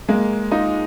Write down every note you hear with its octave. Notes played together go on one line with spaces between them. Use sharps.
G#3 A#3
D#4 F4